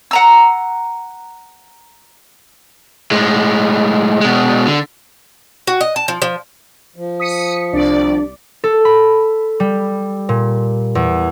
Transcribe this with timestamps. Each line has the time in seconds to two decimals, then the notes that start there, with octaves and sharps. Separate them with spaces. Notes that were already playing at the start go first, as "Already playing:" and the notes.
0.11 F#5 A#5 E6
3.11 A2 G#3
4.21 B2 G#3
4.67 D3
5.67 F#4
5.81 D#5
5.96 A5
6.08 F3
6.22 F3
6.96 F3
7.20 D#6 B6 C#7
7.73 C2 D4 D5
8.64 A4
8.85 B5
9.60 G3
10.29 A#2
10.95 E2